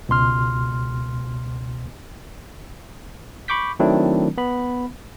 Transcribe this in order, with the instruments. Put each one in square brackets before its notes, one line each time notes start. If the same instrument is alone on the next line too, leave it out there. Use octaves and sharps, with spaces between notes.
[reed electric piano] C#2 B2 C6 F6
[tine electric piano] B5 C#6 D6 G6 B6
D#3 F#3 A3 C4 D4 E4
B3 B5